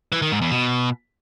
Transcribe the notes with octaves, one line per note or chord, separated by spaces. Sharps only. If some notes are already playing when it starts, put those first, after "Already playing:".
E3
D#3
G#2
E2
B2